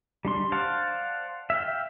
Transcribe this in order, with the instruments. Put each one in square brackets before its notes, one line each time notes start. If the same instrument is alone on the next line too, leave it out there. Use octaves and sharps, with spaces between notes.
[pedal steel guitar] G3 D4 C6
C5 D5 F5 F#5 A5
E5 F5 G5